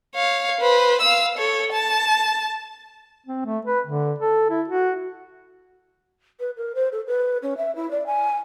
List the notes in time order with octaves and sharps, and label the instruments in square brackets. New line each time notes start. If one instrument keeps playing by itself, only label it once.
[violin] C#5 F5
B4 C5
F5 E6
A4 C#5
A5
[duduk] C4
A3
B4
D3
A4
E4
F#4
[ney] B4
A#4
C5
A4
B4
C#4
E5
E4
D5
G#5